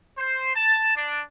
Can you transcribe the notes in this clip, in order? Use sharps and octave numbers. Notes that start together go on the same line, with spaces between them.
C5
A5
D4